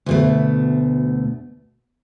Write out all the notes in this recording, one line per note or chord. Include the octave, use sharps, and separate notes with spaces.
D2 B2 A3